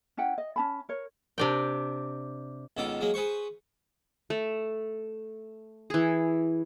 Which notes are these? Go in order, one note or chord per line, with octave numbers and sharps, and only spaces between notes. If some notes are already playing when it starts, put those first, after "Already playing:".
C#4 E4 F#5 G5
D#5
C#4 A5 B5
A#4 C#5
C3 D4 G5
C#2 B2 D#3 A4 D6
F#3 G#3 A#3
G#4 B4 C5 C#6
A3
E3 G#4